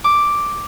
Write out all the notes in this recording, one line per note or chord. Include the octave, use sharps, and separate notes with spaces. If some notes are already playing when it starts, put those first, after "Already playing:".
D6